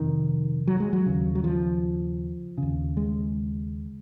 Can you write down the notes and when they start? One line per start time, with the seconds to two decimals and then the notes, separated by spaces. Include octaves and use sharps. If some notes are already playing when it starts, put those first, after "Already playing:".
Already playing: F2 C3 D#3
0.67 F#3
0.80 G#3
0.93 F#3
1.06 D#2 C#3
1.35 F#3
1.44 F3
2.58 D#2 C#3
2.97 G#3